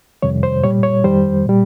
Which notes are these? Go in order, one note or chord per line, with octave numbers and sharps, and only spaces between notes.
F2 C3 D#3 G3 C#5
C5
A#2 G3 C#5
C#5
F2 D#3 G3 C5
A#2 G3